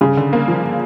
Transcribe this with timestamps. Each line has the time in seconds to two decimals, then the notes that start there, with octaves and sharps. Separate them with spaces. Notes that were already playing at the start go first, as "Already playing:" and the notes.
0.01 G2 C#3
0.17 D3
0.33 A#3
0.48 F3